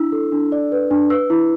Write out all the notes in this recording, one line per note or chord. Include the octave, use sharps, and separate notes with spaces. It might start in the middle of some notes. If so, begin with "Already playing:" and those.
Already playing: D4 E4 E6
A4
D4
D5
B4
D4
B4 E6
E4